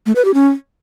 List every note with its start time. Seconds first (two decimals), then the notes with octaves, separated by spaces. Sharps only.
0.06 A3
0.16 B4
0.25 G4
0.34 C#4